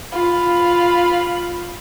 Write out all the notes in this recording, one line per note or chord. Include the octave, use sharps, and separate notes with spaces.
F4 B5